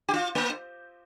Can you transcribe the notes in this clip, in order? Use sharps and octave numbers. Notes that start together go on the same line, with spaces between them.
G4
F4
A#3